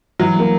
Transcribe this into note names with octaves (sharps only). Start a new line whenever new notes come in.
E3 F#3
G3 A#3